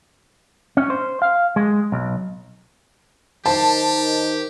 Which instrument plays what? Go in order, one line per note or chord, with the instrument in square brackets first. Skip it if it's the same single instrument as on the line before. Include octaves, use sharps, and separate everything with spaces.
[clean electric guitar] C#4
C5
F5
G#3
B1
[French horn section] D#3 [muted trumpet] G4 [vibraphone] C5 [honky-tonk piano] A5